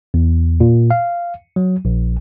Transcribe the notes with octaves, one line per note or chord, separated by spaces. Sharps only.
E2
A#2
F5
F#3
A#1